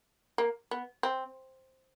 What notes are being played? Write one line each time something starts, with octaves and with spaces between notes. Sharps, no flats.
A#3
B3
C4